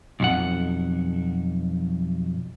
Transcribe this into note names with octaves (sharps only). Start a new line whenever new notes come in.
B1 F2 F#5